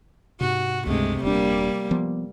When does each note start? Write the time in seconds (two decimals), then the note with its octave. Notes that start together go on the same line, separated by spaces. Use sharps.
0.41 G#2 C3 F#4
0.87 C#2 G2 C3 G#3 A3
1.23 D#1 G3 A#3 D4
1.91 F3 B3